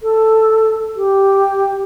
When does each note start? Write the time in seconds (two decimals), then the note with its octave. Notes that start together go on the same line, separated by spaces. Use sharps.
0.02 A4
0.96 G4